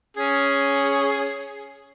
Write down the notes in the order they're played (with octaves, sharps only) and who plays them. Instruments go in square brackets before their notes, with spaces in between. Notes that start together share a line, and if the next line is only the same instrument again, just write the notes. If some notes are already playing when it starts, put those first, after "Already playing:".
[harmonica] C#4 G#4